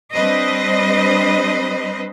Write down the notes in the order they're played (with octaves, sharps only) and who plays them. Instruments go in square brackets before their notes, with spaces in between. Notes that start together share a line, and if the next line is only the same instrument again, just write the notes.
[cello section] G3 C4 D4 B4 C5 D#5